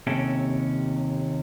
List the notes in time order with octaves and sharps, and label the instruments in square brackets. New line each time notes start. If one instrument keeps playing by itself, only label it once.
[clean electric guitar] D#2 C3 C#4 A4 G5